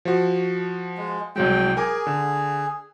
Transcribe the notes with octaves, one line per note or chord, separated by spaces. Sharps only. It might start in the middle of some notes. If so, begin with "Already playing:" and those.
F3 F#4
G#3
C2 F#3 G#3 G5
G#4 A#4 G#5 D6
D3